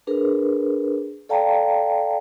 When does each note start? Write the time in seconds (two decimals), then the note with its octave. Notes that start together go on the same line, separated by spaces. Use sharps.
0.07 D4 G#4 A#4 B4
1.29 A4 D5 F5 G5 A5 A#5